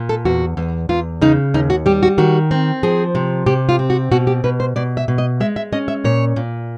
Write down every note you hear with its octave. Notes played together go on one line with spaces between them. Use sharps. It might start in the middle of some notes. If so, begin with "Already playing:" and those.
Already playing: A#2
A4
E2 F#4
E2
E2 F4
C#3 D#4
D#2 D#4
F#4
G3 G4
F#4
D#3 F#4
C4
F3 G#4
C3
C3 G4
F4
C4
F#4
B2 F#4
G4
B2 B4
C5
B2 D5
E5
B2
D#5
G#3 E5
E5
C#4 D#5
E5
A#2 C#5
A#2